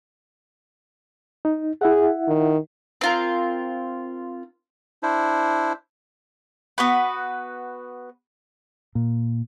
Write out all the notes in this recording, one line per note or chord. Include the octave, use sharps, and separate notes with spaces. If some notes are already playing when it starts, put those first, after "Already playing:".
D#4
E4 G#4 E5 F#5
D#3
C4 F4 A#4
D4 E4 C5
B3 F#4 B4
A#2